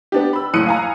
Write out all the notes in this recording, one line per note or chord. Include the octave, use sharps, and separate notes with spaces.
B3 D4 G4
B5 E6
F#1 A2 D#6 F#6 C#7 D#7
F5 G#5 A#5